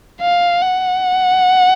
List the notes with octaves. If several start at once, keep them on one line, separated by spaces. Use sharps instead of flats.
F5
F#5